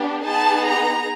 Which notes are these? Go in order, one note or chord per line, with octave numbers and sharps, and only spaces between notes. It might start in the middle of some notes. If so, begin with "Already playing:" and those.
Already playing: B3 D4 G4
B3 D#4 G#4 A5
A#5